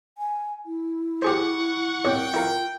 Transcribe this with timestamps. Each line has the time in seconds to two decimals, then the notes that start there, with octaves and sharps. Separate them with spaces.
0.18 G#5
0.66 E4
1.22 G4 G#4 C5 F#5 C#6
2.05 C2 A#2 C#5 G5
2.34 E4 F4 A#4 F5